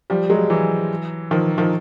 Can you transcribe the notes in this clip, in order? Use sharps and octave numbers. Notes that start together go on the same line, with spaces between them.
F3 G3
F#3 G#3
E3 F#3
D#3 F3
D#3 F3